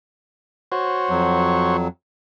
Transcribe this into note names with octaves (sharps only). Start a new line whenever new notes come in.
F#4 C5 C#5
F2 F#3